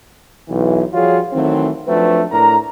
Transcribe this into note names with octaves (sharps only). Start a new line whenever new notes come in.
B1 E3
F3 G3 F4 F#4 G#4 C#5
D#3 E3 F#3 A3 C4
F3 F#3 A3 C4 D4 B4
A2 D4 A#4 A#5